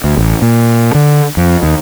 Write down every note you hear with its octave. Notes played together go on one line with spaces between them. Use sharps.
D2
A1
A#2
D3
F2
D#2